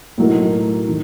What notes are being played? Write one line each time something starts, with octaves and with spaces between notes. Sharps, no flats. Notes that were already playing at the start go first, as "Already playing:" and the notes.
A2 F#3 A3 D#4 A#4
D#3